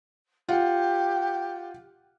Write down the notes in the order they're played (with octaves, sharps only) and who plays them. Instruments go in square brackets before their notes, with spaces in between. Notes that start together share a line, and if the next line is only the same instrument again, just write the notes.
[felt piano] F4 F#5 [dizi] G4